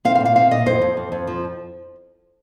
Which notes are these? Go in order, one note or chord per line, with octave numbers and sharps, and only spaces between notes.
C4 F5
F5
A#2
F5
C4 F5
A#2 D#5
F2 C5
F2
F2
F2
F3